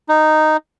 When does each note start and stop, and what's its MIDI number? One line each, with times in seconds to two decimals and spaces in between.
0.09 0.57 63